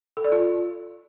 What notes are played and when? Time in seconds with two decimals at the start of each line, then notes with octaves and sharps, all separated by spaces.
0.17 A4
0.24 D5
0.32 F4